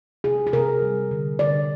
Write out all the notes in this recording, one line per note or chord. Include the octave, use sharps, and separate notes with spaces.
C3 G#4
G#4
C3 A#4
G3
D3
D3 D5